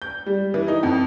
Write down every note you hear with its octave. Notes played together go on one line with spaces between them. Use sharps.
G6
G3
E3
D#4
F2